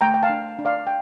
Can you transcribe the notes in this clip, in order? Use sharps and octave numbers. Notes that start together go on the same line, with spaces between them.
A3 G5 A#5
G5
F5 A5
D4
D4
D5 F5
G5